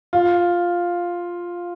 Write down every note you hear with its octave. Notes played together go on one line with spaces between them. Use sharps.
F4